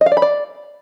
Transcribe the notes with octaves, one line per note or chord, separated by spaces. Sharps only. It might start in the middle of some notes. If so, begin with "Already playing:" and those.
D#5
F5
D5
B5
D5